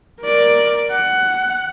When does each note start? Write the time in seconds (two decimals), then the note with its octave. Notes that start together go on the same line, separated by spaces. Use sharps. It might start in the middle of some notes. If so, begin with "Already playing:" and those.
0.22 A#4 D5
0.91 F#5